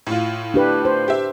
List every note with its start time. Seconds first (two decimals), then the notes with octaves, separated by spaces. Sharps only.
0.07 A2 F4
0.54 D4 G4 B4
0.85 C5
1.08 G4 E5